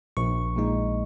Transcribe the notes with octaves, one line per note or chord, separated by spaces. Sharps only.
A#1 C#6
A#2 G#3 D#4